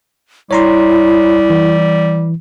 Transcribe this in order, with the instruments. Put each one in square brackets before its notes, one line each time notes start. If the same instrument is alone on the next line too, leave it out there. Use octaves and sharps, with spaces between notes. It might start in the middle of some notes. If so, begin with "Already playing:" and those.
[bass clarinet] G3 [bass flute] E4 [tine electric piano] C#5 A#5 C6
[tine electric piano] E3